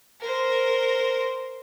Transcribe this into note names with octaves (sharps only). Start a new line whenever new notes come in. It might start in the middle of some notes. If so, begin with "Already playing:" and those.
A#4 C5